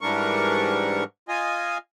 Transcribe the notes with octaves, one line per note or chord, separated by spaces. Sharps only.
G#2 E3 G3 D4 A#4 C#6
F4 D#5 G#5